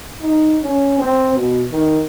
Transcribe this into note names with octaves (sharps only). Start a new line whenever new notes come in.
D#4
C#4
C4
B2
D#3